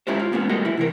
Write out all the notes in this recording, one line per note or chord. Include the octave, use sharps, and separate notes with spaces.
G#3 C#4 E4 F4 G4 C5
F4
G#3 A#3 B3 C#4
G3 A3 F#4 A4 A#4 D#5
F3 E4
C3 E3 A#4